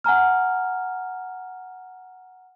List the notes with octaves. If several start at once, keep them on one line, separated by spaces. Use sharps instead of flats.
F#5 G#5 A#5 F6